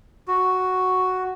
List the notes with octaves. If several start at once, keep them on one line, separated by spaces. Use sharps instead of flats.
F#4